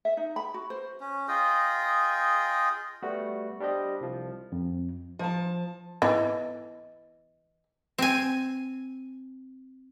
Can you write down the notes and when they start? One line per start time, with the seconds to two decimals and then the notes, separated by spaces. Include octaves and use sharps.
0.05 E5
0.17 D#4
0.36 B5
0.54 F#4
0.70 C5
1.00 C#4
1.28 F4 G#4 D#5 G5
3.03 G3 A3 B3 F#4
3.60 G3 D4 G4 C5 D#5
4.01 C2 F3
4.52 F2
5.19 F3 A5
6.02 G#2 E3 B3 D#5
7.98 C4 G#5